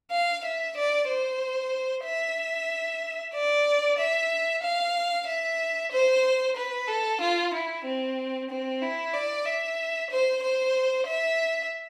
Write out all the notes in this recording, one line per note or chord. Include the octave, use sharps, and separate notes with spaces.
F5
E5
D5
C5
E5
D5
E5
F5
E5
C5
B4
A4
F4
E4
C4
C4
E4
D5
E5
C5
C5
E5